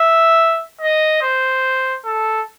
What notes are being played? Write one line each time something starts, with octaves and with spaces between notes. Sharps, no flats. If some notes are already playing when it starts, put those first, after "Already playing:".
Already playing: E5
D#5
C5
A4